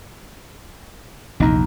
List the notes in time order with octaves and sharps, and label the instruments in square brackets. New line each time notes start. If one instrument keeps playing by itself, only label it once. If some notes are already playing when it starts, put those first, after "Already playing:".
[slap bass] A#1 E2 [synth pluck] C3 D#4 A#5